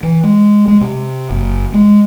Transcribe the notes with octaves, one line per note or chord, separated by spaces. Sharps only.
E3
G#3
G#3
C3
F#1
G#3